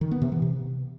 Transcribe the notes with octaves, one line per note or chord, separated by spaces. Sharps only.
D#3
B3
C3
E3
C3